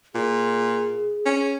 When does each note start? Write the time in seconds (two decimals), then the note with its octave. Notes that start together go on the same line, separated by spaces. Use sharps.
0.15 A#2 G#4
1.26 C#4